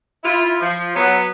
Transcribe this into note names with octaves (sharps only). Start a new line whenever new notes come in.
E4 F4
F3
F#3 B3